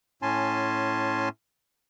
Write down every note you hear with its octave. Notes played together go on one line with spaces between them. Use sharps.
A2 C#4 G#5 A5 C6